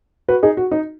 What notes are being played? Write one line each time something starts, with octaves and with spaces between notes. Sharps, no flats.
F#4 B4
D#4 G#4
F#4
D#4